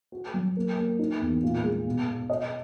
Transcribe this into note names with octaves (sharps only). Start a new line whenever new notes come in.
F#4
F#3
A#3
A#3
D#4
E2
A#2
G#3
B2
B2
D#5